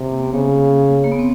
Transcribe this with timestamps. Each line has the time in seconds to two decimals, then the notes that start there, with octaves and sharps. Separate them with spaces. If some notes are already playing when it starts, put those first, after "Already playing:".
Already playing: C3
0.11 A#3
0.23 B3
0.33 C#3 A#3
1.04 A#3
1.12 B3
1.19 C4